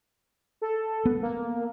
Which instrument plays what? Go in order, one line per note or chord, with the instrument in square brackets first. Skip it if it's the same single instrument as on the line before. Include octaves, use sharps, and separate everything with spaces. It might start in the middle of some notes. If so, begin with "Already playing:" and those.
[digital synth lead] A4
[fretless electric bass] B3
[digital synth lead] A#3